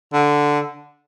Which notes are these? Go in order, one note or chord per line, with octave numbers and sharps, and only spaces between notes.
D3